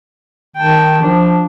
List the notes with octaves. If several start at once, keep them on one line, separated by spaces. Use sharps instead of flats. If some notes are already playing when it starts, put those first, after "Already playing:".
D#3 G5 A5
F3 D4